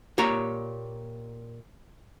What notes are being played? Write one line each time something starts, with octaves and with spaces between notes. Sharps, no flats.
A#2 G4 C#5 A#5